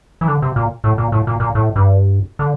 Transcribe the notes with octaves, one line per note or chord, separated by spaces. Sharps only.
E3
D3
C3
A#2
A2
A#2
A2
A#2
A#2
A2
G2
D3